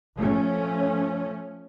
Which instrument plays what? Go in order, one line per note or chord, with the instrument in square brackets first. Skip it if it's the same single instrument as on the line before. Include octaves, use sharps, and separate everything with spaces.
[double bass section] F3 A3 C#4